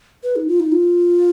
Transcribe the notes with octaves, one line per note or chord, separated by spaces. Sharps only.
B4
D#4
F4
D#4
F4